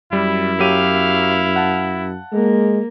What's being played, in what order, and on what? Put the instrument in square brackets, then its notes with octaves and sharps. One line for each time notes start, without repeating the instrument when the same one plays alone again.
[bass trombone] F#2 [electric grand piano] G3 [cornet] E4
[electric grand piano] F#3 G4 D#7 [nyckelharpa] F5
[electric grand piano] F#5 A5
[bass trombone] G#3 [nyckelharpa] A#3